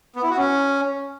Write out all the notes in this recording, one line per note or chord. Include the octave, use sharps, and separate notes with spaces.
B3
E4
F#4
C#4